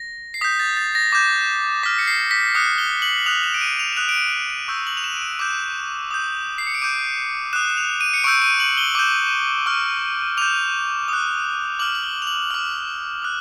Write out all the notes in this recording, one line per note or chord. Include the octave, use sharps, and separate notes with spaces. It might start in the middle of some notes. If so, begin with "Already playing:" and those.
Already playing: A#6
C7
D#6 G6 B6
A6
A6
A#6
D6 G6
D6 F6 B6
C#7
C7
B6
D#6 F#6 C#7
G7
F#7
D#6 F#6 F7
E7
D7
D#7
F7
E7
D#6 F#6 F7
D7
D#7
D7
D#7
C#6 E6 G6
F#7
F7
E7
D7
D#7
D6 G6 E7
D#6 G6
C7
C#7
D7
D6 G6 D#7
D#6 F#6 E7
E7
F7
D#7
C#7
C#6 E6 G6 D7
D#7
F#7
G7
D6 G6
C#6 F6
D6 G6 F7
D#6 F#6
D6 F6 F#7
F#7
G7
F7
F#7
D6 F6
D#6 F#6